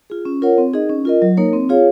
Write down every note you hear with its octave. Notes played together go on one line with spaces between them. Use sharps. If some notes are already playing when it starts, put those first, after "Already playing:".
F4 G#4
C#4
F4 A#4 C#5 F#5
C4
D#4 G#4 D#5
C#4
F4 A#4 D#5
F#3
A#3 D#4 A#4 C#5
C4
F4 G#4 C#5 F5